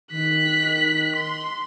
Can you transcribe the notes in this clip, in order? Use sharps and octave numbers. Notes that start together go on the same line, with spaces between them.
D#3 F#6 B6
C6